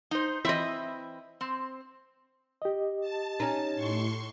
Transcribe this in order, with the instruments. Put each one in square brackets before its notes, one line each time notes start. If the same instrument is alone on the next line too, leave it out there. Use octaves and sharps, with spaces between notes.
[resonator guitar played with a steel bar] D#4 C5
[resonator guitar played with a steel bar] E3 C4 E4 [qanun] D#5 E5
[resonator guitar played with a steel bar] C4
[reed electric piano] G4 D#5
[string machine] A5
[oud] C#4 D#4
[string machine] A2 C6 C#6